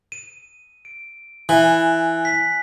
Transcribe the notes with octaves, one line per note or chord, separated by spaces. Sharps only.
D#7
D7
E3 G#5 F#6 F#7
B6